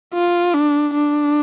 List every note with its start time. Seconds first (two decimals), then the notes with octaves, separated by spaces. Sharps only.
0.14 F4
0.54 D4
0.94 D4